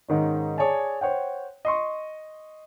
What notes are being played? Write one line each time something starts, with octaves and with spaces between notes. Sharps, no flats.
G#2 D#3 C#4
G#4 C#5 D5 G#5 A5
C5 C#5 F#5 G5
D#5 C6 C#6